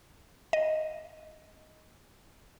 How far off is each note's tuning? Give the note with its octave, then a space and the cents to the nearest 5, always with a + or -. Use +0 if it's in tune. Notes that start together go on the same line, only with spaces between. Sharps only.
D#5 +0